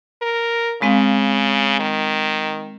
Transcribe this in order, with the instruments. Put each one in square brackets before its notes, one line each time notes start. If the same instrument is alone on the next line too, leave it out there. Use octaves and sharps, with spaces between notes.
[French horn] A#4
[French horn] C#3 [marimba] G#3 C4 F5
[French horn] D#3